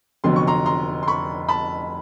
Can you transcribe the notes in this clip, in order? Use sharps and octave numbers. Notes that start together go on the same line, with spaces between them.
F1 F2 D3 F#3 B3 C6
C#6
A#5 C6
A#5 C6
C6
B5 C#6
A5 B5